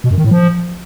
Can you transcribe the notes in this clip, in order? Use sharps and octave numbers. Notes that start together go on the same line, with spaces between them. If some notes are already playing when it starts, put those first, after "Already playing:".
B2
F#2
D#3
A2
F3